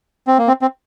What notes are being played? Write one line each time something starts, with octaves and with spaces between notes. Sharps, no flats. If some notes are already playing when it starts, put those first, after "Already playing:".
C4
A#3
C4
C4